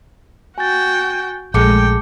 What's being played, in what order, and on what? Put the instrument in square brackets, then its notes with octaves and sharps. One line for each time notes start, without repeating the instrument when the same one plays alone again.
[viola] F#4 G5 [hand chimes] G#5 A6
[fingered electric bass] A#1 [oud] G#3 A3 [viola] G5 [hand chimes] A5 D6 C#7